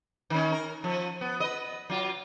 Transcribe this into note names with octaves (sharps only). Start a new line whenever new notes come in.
D#3 C#4
A#4
F3
B3
B4 D#5
F#3 F4